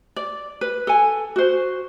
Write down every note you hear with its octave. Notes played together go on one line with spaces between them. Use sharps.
D5
B4
A4 G#5
F#4 C5